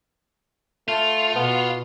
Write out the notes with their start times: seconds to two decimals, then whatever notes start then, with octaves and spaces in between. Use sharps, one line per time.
0.88 A3 F4
1.36 B2 B3